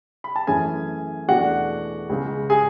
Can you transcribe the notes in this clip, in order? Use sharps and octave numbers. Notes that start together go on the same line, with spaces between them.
B5
A5
F#2 E3 A3 C#4 G#4 G#5
E2 B2 A3 D4 F#4 F#5
C#2 C#3 G#3
G#4 G#5